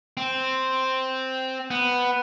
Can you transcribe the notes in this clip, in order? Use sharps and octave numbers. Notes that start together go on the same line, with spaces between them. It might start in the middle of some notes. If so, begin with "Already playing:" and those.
C4
B3